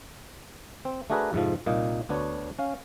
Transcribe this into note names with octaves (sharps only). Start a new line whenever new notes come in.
C4
A3 D4 F#4 G#4 A#4 B4
F2 G#2 C3 F3
C2 A#2 A#3 D#4
D2 B3 D4 F#4 C#5
C#4 F5